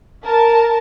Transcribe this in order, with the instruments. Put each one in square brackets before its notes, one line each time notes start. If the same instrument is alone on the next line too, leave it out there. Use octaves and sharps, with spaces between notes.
[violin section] A#4 A5